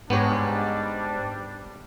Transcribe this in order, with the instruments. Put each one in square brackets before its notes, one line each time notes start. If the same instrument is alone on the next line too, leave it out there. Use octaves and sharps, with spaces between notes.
[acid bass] G#2 [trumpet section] G3 D4 [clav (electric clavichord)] B3 G4 C#5